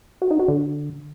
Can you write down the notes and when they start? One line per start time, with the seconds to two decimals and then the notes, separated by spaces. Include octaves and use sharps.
0.22 F#4
0.31 D#4
0.39 F#4
0.48 D3